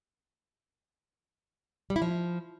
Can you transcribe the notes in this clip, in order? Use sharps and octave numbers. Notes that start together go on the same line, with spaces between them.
G3
E4
F3